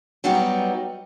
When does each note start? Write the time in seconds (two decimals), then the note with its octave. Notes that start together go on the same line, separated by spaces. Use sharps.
0.24 F#3 G3 B3 D#4 F#4 G4